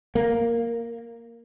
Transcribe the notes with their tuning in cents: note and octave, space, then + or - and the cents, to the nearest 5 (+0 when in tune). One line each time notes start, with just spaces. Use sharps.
A#3 -5